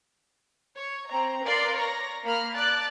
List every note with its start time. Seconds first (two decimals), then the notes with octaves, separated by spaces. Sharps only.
0.75 C#5
1.08 C4 A#5
1.44 A#4 B4 D5 F5 A#5 C6
1.76 C#5 A#5 A#6
2.25 A#3 B5 F6
2.55 D5 A5 F#6 A6